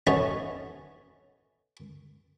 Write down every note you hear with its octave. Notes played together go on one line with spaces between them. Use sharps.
B3 C#4 D#4 A4 C#5 E5